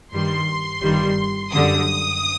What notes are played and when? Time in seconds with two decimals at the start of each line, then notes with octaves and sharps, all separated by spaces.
0.11 G2 D#3 G3 C6
0.81 G1 G2 D#3 G3
1.52 F#2 D3 G3 D#6